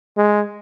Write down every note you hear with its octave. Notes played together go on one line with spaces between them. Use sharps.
G#3